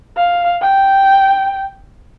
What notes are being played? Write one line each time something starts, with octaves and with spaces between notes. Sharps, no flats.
F5
G5